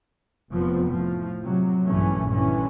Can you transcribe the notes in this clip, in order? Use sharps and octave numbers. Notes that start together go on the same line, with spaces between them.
F1 F3 B3 C4
A2 F3
C3 F#3
A#1 G2 E3 A3 C#4
G2 D3 E3 C#4